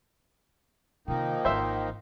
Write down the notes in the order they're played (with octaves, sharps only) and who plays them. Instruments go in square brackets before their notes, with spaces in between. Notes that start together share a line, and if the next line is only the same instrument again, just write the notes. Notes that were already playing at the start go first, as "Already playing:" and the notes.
[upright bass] C3 D#3 [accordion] F3 A#3 D#4 [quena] G5
[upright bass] G#1 E3 [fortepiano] C5 E5